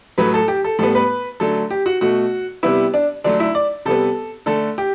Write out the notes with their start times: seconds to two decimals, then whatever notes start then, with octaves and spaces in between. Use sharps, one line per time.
0.18 A2 F#3 A3 B4
0.34 A4
0.48 G4
0.64 A4
0.79 A2 G3 B3 A4
0.95 B4
1.40 D3 F#3 A3 A4
1.70 G4
1.86 F#4
2.01 B2 A3 F#4
2.63 C3 G3 B3 E4
2.94 D4
3.24 D3 F#3 A3 D4
3.40 E4
3.55 D5
3.85 C3 G3 B3 A4
4.46 D3 A3 A4
4.78 G4